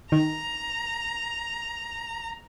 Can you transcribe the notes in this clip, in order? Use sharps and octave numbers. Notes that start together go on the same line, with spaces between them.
D#3 A#5